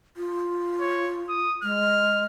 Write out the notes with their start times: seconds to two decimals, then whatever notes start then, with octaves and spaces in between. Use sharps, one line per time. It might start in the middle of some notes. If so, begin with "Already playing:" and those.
0.17 F4
0.81 C#5
1.29 D#6
1.63 G#3 F6